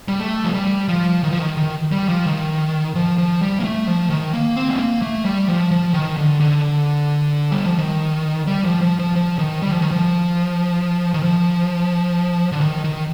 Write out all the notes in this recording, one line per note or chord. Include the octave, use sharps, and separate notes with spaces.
G3
A3
F3
G3
F3
D#3
F3
D#3
D#3
G3
F3
D#3
F3
F3
G3
A#3
A3
F3
D#3
A#3
C4
A3
A#3
A3
G3
F3
F3
D#3
D3
D3
G3
F3
D#3
G3
F3
F3
F3
F3
D#3
G3
F3
D#3
F3
D#3
F3
D3
D#3
D#3